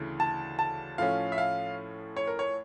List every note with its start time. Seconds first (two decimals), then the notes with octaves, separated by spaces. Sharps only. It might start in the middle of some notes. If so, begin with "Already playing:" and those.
Already playing: D2 C#3 E3 A3
0.20 A5
0.59 A5
0.98 A2 F3 A3 C#4 F5
1.32 E5
1.38 F5
2.17 C#5
2.27 A#4
2.39 C#5